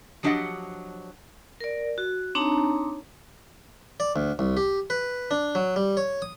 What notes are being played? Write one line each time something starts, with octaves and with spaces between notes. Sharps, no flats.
F3 F#3 D4 G4 D#5 F#5
A#4 D5
F#4
C4 D4 D#4 C#5 A5 A#5
D5
D2
C2
G4
B4
D4
F#3
G3
C#5
D#6